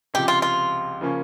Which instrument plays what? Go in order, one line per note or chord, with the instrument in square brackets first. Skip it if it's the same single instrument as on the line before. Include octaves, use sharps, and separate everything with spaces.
[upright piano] C#2 C3 F3 [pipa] G4
[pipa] F4
F4
[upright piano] C#3 F3 A#3 C#4